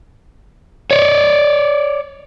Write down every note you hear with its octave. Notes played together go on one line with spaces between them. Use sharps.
C#5 D5